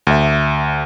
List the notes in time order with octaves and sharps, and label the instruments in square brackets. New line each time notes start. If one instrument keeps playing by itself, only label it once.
[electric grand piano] D2 E5